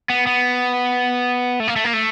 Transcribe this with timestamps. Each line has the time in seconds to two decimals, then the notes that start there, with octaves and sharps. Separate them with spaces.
0.10 B3
0.27 B3
1.60 A3
1.68 A#3
1.76 A3
1.84 A#3
1.94 A3